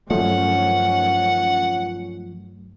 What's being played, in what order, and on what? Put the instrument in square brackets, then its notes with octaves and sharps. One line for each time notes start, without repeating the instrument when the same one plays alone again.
[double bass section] G2 D#3 C#4 [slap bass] F3 [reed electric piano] F#3 A3 [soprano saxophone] F#5